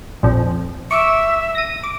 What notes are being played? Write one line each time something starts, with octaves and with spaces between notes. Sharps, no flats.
A#1 F2
E5 C#6 D6
A#6 D#7
D6